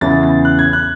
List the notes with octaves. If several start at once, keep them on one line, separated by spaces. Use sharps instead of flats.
E2 C#3 E3 A6
A6
F#6
G#6
F#6